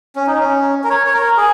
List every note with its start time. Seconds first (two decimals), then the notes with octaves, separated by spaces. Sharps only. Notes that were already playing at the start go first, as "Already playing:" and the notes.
0.16 C#4
0.27 D#4
0.39 C#4
0.84 A#4
0.90 C#5
1.07 C#5
1.14 A#4
1.37 G#4